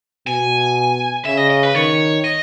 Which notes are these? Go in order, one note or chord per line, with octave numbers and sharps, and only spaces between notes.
B2 G#5
C#3 E5
D#5
D#5
B4
D#3 C#5
D#5